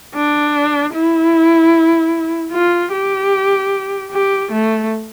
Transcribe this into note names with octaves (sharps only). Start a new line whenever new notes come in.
D4
E4
F4
G4
G4
A3